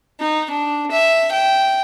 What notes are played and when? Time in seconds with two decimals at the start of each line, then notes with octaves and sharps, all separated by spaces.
0.21 D#4
0.51 D4
0.91 E5
1.32 G5